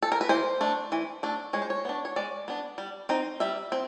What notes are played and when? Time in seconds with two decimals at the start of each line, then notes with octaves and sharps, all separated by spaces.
0.02 A4
0.12 A#4
0.21 B4
0.29 E3 C5
0.61 A3 D4
0.92 E3
1.23 A3 D4
1.53 G#3 C#5
1.62 C5
1.70 C#5
1.85 B3 D4
2.05 C#5
2.16 G#3 D5
2.48 B3 D4
2.78 G3
3.09 C4 D#4
3.40 G3 E5
3.72 C4